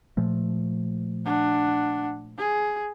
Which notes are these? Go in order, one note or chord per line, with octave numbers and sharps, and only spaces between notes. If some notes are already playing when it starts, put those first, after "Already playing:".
A#2 F3 A3
D4 F#5
G#4